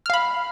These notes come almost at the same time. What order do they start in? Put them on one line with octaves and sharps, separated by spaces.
F6 F5 B5